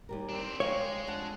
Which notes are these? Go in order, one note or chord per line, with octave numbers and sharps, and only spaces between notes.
D#2 G3 A#4
C4 D4
G#3 C#5 D5 F5 G5
F2 D4 F#5